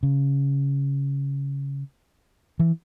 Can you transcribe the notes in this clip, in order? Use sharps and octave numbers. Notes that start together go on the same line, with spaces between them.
C#3
E3